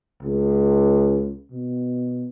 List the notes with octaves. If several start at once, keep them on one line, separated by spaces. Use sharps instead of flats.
C#2
B2